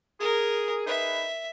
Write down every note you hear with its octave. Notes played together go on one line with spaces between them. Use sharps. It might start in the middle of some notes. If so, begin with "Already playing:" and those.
G#4 A#4
D#4 G#4 B4 E5